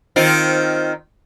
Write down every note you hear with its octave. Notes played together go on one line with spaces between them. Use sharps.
D#3 C4 F4